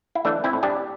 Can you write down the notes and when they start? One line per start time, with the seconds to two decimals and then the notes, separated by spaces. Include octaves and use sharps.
0.15 E4
0.25 E3 A3 D4
0.44 C4 E4
0.53 A2
0.63 D4 G4